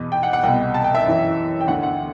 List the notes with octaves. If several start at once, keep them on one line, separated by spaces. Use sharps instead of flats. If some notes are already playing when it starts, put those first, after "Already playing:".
Already playing: E2 B2
G5
F#5
F#5
C2 B2 G5
A5
G5
E5
F#2 E3
G5
D2 D3 F#5
F#5